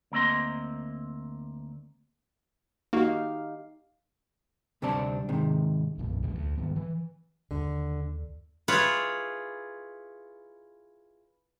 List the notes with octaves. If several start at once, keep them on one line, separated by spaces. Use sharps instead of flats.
D2 A#3 C4 D#5 C6
A#3 D#4 F#4 G4 F5
D2 C3 G3 C4 D4 A5
G#2 C3 D#3
B1 F#2 A#2
E2 A#2 F#3 A#3
D2
G#2 D#3 B3
E3
D#2 D3
E4 F4 G#4 B4 C#5